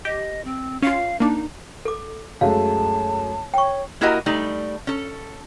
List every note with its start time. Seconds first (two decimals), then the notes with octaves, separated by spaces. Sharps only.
0.05 G4 D#5
0.45 C4
0.82 C#4 F4 F5
1.20 A#3 D4 D#4
1.85 A4 D6
2.41 F#2 G#3 A3 F5 A5
3.54 C#5 G5 C#6
4.01 A#3 E4 F#4 G4 A#4 D#5
4.26 G3 A3 D#4
4.87 C#4 A4